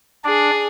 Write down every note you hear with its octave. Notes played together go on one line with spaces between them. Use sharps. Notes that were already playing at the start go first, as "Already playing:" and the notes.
D4 G#4 D5